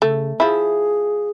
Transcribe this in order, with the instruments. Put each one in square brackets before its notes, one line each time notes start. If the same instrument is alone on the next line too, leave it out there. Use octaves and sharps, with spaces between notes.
[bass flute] C#3 [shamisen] A3
[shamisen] F3 E4 [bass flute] G#4